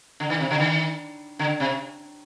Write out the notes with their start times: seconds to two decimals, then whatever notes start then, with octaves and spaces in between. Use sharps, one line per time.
0.20 D3
0.30 D#3
0.40 C3
0.51 D3
0.60 D#3
1.39 D3
1.60 C3